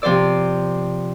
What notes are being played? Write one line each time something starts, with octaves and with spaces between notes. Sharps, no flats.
C3 F3 C5 D5 E6